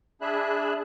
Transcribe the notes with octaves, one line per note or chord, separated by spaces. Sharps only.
D4 G#4 E5 B5 F#6